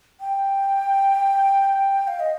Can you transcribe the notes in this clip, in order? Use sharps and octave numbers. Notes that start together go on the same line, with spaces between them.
G5
F5
D#5